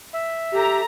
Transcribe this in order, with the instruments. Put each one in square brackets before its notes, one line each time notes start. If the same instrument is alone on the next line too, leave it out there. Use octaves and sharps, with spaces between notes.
[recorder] E5
[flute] G4 [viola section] A4 A#5